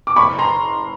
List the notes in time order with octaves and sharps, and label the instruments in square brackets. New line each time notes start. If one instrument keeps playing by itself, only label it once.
[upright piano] D6
F#1 B5 C#6
A#5 C6